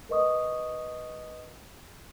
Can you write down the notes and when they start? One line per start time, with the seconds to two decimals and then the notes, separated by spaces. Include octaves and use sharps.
0.09 A#4 B4 D#5 C#6 D#6